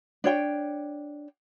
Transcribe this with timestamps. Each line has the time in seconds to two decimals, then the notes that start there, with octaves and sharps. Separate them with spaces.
0.24 D4 C#5 G5